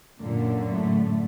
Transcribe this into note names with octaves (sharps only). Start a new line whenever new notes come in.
F#2 A#2 D3 A#3
A2 A3